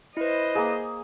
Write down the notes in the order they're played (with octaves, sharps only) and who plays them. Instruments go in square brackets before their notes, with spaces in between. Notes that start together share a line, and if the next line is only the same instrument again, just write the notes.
[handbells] E4 B4 [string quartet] C5 D#5
[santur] A#3 G#4